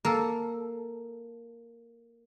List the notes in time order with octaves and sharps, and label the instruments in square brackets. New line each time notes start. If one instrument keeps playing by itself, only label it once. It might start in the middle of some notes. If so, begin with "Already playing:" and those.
[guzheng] A#3 A4